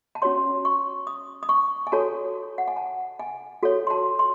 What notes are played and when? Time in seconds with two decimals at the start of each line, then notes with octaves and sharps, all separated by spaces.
0.15 A5
0.22 C#4 F#4 C#5 C6
0.65 C#6
1.07 D#6
1.43 D#6
1.49 C#6
1.87 G#5
1.92 F#4 A4 C#5 A5
2.58 F#5
2.68 G#5
2.76 A5
3.19 G#5
3.63 F#4 A4 C#5
3.87 C6
3.90 A5
4.19 C6